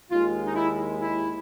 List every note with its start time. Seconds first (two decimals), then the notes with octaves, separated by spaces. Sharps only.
0.10 D#2 D#3 G#3 F4
0.46 D#4
0.55 E4
1.01 E4